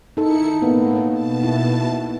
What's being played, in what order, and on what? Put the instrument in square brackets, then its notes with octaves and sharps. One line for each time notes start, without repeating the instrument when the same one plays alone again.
[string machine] D#3 E4 C#7 [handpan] D#4 A4
[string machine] A2 [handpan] A#3 B3
[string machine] B2 A5
[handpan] E4